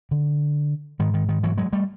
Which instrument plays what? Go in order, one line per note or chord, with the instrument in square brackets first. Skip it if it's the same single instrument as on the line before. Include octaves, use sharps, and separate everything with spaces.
[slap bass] D3
G#2 D#3
D#3
D#3
E3 F#3
F#3 G#3
G3 A3